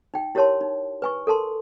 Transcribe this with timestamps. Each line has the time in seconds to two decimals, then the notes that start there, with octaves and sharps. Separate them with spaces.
0.14 D#4 G5
0.35 E4 G4 A#4 C#5 A5 C6
0.61 D#4
1.02 B4 G#5 C#6
1.27 A4 A#4 A5 C6